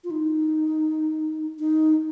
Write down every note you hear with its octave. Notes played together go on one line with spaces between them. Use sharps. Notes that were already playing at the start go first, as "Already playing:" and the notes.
F4
D#4
D#4